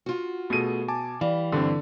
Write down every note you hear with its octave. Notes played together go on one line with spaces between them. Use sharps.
F4 F#4
B2 A3 G#4 A4 D#7
G#5 A5 D6
E3 G3 F5
G2 D3 C4